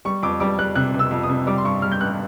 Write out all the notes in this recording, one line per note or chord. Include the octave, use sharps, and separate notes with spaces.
G3 C#6
F2 D6
G3 D6
G3 F#6
C3 F#6
C3 E6
F2
D#6
C3
G3 D6
C6
G2 C#6
G3 F6
G6
A1 F#6